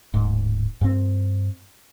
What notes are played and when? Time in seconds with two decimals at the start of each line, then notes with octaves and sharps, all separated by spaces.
0.14 D1 G#2
0.81 G2 C4